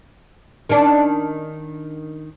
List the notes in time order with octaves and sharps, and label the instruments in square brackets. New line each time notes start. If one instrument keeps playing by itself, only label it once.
[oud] D#3 C#4 D4